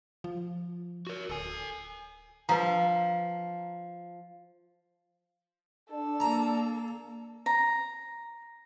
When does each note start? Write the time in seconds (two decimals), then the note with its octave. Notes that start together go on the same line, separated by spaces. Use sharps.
0.24 F3
1.07 F#4 A#4
1.30 D1 A4 G#5
2.49 F3 B4 F5 A#5
5.91 D4 A4
6.20 A#3 A#5
7.46 A#5